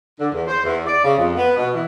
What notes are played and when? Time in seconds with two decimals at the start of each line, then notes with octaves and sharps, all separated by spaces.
0.18 D3
0.32 E2
0.47 C5
0.63 E2
0.86 D5
1.03 C#3
1.17 F2
1.35 B3
1.56 B2
1.73 E3